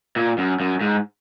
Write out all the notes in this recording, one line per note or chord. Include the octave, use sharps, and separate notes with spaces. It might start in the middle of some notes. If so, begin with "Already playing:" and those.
A#2
F#2
F#2
G#2